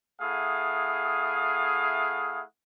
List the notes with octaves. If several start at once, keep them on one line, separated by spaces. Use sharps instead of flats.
A3 E4 G#4 F5 F#5 D#6